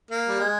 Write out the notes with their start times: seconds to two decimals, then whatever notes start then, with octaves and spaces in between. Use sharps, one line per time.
0.11 A#3
0.29 G3
0.40 G#3